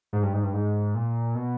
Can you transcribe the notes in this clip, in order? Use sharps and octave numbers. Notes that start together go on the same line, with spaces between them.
G#2
G2
G#2
G2
G#2
A#2
B2